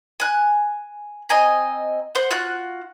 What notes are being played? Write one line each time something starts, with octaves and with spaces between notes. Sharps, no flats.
G#5 F#6
C4 D#5 G#5 A#5
C5 F#5
F4 F#4 F#6